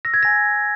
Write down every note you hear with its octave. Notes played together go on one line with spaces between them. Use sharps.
E6 A#6
G#6
G#5 A#6